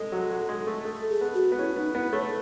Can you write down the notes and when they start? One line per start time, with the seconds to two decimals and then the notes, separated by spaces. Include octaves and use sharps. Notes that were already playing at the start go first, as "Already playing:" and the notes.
Already playing: G#3 A4
0.12 F#3
0.30 F#3
0.49 G#3
0.67 A3
0.85 A3 A4
1.09 G#4
1.21 B3
1.34 F#4
1.52 B3
1.58 C#4 E4
1.76 B3 D#4
1.95 B3 E4
2.13 A3 C#5
2.23 B4